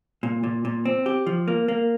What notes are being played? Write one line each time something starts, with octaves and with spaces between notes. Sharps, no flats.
A#2
A#2
A#2
C4
G4
F3
A#3
A#3